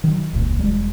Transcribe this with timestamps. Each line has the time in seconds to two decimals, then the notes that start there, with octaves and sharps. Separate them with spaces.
0.04 D#3 F#3
0.33 E1 C#2 A#2
0.59 E1 G3 G#3